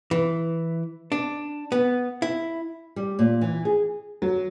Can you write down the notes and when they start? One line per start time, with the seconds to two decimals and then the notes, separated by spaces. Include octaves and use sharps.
0.11 E3
1.12 D4
1.72 B3
2.22 E4
2.96 G3
3.19 A#2
3.41 E3
3.65 G#4
4.22 F#3